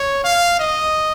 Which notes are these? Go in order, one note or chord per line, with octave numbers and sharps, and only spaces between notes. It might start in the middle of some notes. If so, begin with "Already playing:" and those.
Already playing: C#5
F5
D#5